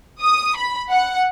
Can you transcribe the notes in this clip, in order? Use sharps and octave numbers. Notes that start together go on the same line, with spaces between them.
D#6
B5
F#5